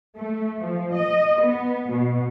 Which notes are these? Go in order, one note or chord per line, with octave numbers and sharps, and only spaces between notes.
A3
F3
D#5
B3
B2